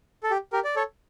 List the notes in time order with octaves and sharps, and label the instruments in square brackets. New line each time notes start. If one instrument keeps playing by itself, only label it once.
[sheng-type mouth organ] A4
G4
G4 A#4
D5
A4 C#5